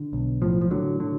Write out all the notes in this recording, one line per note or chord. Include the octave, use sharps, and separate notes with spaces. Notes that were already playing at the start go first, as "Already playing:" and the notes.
Already playing: D3
B1
A2 F3
F3
A2 D3 F#3
D3 F#3